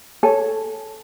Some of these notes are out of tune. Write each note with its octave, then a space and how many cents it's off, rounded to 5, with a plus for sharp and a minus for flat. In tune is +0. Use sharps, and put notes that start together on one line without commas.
A4 -5 C#5 +0 G#5 +0